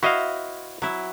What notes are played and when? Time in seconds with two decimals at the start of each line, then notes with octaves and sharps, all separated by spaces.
0.03 E4 F#4 C5 D#5 F5
0.82 F#3 E4